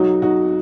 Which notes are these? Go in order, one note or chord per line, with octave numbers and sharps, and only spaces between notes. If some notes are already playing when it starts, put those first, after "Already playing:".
Already playing: B1 F#3 D#4 F#4
D#4 F#4